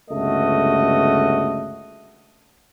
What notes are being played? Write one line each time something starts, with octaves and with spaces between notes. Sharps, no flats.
G1 C#2 A3 F#4 D#5